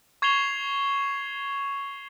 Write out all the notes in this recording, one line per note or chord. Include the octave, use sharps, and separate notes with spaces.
C#6 G#6 C7 E7 F7 G7